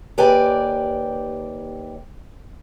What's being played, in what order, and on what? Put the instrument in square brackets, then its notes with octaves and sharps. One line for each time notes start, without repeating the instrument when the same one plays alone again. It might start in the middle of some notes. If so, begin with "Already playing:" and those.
[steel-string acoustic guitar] D#2 G4 B4 D5 G5 G#5